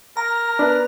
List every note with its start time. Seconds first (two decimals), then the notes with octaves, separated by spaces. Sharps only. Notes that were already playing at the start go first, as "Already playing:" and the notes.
0.17 A#4 A#5
0.59 B3 D4 B4 D5